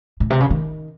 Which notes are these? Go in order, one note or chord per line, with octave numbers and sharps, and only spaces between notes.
A2
C3
C#3
D#3